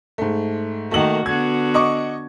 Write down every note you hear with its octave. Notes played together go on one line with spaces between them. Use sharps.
G#2 A3
D#3 A3 A#3 F#4 F#7
D3 B3 F#4 G#6
D#5 C#6 D6